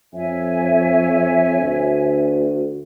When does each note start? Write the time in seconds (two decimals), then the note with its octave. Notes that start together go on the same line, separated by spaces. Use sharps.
0.13 F2 C#5 E5 G#5
1.59 D2